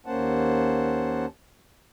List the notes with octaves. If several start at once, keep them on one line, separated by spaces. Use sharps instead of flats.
D#2 A#3 C#4 C5 F#5 A5